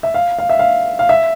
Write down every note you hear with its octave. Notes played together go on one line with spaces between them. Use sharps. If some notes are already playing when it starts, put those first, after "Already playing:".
E5
F5
F5
E5
F5
F5
E5